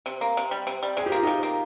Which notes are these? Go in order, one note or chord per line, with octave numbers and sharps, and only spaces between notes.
C3
A#3
C3
G3
C3
G3
C3 G#4
G4
A#3 F4
C3 D#4 G4
A#3